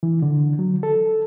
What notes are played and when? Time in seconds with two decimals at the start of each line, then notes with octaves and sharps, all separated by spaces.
0.03 E3
0.22 D3
0.59 F#3
0.83 A4